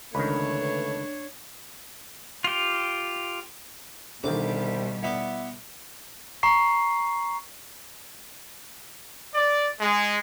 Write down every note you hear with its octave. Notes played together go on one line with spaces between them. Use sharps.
C#2 D3 D#3 A3 D4 B4 C#5
F4 G4
C2 B2 D3 D#3 G3 D6
B3 E4 D5
A#5 C#6 C7
D5
G#3